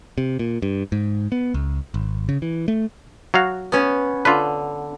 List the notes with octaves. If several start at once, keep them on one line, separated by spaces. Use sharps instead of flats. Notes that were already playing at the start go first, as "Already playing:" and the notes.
C3
A#2
G2
G#2
B3
C#2
G#1
C#3
E3
A3
F#3 F#4 F5
B3 C#4
D3 F4 B4